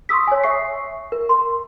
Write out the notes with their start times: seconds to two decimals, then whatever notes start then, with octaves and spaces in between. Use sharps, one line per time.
0.09 C6 C#6 D#6 E6 B6
0.27 C#5 G#5
0.44 E5 C#6 C7
1.12 A#4
1.29 C6